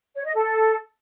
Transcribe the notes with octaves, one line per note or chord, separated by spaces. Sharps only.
C#5
D#5
A4